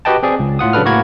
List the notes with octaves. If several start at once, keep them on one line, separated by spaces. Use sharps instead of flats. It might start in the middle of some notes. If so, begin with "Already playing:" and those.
F#4 G4 B4 D#5 G5 A5
C4 G#4 D5
C#2
A2 F4 F#5 D#6
C#3 F#3 D4 A4 B4 F6
A2 A#3 F#4 A#4 B5 G#6